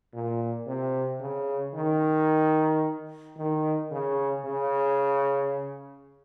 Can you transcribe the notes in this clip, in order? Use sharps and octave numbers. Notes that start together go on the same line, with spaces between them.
A#2
C3
C#3
D#3
D#3
C#3
C#3